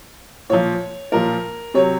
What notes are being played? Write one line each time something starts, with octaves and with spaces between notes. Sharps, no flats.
A#2 F3 C#5
A#2 F3 A#4
C3 F#3 C#5